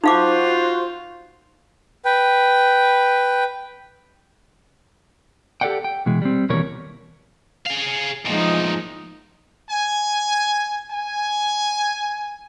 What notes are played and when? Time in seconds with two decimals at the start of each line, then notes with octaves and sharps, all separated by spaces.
0.04 D#4 F4 F#4 C5 F5 D6
2.05 B4 G5
5.61 G4 A4 C5 D5 F#5 G5
5.84 G5
6.06 B2 E3 G#3
6.22 G3 C4
6.49 D#2 B2 E3 G3 A#4 C#5
7.67 G#4 F5
8.25 E2 A#2 F3 G#3 D#4
9.71 G#5
10.90 G#5